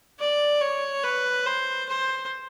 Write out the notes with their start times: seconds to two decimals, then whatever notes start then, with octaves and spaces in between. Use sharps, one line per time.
0.19 D5
0.61 C#5
1.04 B4
1.46 C5
1.89 C5